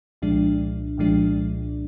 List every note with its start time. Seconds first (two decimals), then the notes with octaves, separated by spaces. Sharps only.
0.22 C2 A#2 F3 G#3 D4
0.98 C2 A#2 F3 G#3 D4